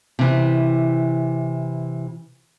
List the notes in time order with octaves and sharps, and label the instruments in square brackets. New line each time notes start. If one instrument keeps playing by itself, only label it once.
[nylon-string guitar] C3 E3